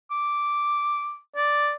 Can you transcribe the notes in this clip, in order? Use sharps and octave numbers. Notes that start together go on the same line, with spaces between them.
D6
D5